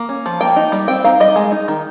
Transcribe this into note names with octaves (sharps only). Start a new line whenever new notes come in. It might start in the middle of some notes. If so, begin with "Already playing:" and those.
Already playing: A#3
C#4
F3
A#3 G5
D#4
G3
C4 G5
D#4 F5
G3 D#5
G#3
D#4
D#3